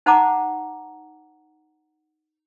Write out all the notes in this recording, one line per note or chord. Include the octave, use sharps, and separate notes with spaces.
D#4 C5 F#5 A5 A#5 D6